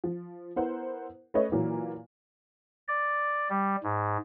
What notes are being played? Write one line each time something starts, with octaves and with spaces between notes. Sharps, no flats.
F3
B3 E4 A#4 C5 F#5
A3 C#4 B4 C#5 D#5 E5
A#2 E3 F#3 A#3
D5
G3
G#2